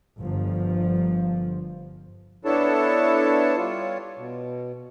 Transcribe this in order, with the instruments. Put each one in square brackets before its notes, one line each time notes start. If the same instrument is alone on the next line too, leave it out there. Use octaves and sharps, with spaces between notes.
[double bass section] G1 F3
[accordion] B3 D4 E4 A4 C#5 A5
G3 F4 C#5
B2